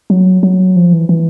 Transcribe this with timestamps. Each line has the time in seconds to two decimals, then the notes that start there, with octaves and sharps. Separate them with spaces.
0.10 F#3
0.43 F#3
0.76 F3
0.93 E3
1.09 E3